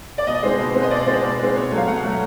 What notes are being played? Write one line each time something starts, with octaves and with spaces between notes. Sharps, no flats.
D5
B2 D#5
G#3 C4
B2
G#3 C4
D#5
B2 D5
G#3 C4
B2
G#3 C4
B2 C#5
F#3 A3
F5
B2 F#5
F#3 A3